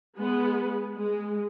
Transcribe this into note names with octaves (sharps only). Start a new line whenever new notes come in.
G#3 B3
G#3